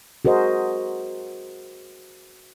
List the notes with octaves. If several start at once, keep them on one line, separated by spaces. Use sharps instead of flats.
F#4 G#4 A#4 C5 D#5